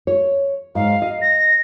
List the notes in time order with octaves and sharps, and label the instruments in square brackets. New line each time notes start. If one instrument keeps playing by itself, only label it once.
[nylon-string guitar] C#5
[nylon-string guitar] G#2 [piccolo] F5
[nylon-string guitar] D#5
[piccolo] A#6